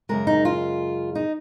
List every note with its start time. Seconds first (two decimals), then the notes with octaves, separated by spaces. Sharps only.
0.09 F#2 C#3 G#3 A#4
0.27 D#4
0.45 F4
1.15 D#4